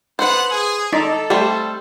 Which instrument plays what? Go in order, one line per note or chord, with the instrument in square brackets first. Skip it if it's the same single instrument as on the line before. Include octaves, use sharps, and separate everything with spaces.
[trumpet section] B3 F#5 [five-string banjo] B4 C5
[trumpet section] G#4
[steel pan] D#4 A#5 [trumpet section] A4 [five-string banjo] D5
[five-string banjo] G3 A3 C5 [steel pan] G4